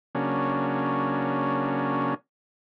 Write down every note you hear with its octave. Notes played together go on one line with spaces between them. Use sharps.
C#3 F#3 A#3 C#4 D4